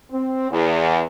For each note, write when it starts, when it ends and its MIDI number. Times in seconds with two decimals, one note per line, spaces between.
0.11 0.49 60
0.51 1.01 40